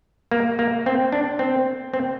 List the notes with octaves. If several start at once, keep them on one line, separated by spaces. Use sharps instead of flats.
A#3
A#3
C4
D4
C4
C4